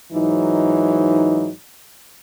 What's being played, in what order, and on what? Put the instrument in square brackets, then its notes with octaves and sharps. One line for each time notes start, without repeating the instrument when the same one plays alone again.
[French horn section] G#2 E3 F#3 D#4